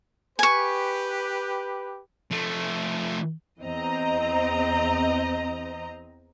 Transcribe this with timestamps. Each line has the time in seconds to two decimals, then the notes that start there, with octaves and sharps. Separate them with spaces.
0.39 G4 B4 G#5 C#6
2.31 F3 A3
3.61 E2 C4 D#5 A#5